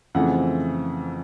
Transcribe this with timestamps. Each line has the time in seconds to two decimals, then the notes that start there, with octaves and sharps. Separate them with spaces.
0.15 F2 C#3 E3 A3 C4 F#5